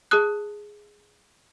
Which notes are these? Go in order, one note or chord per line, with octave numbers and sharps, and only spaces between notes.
G#4 A5 D#6 F#6